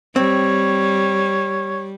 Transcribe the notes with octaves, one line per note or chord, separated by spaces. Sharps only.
G3 C4 C#5